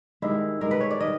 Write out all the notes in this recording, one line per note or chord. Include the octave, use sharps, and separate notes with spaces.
G2 D#3 G#3 E4
G2 D#3 G#3 A#4
B4
C#5
D5
D#3 G3 D#5